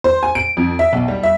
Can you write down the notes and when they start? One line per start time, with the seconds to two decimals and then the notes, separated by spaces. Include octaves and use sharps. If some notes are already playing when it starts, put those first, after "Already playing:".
0.04 C5
0.23 G#5
0.35 D7
0.57 F2
0.79 E5
0.93 B1
1.08 G3
1.23 E5